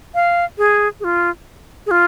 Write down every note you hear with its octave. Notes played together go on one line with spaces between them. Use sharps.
F5
G#4
G#4
F4
G#4
F4